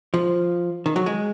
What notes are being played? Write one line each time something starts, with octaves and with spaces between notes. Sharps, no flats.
F3
D#3
F#3
G#3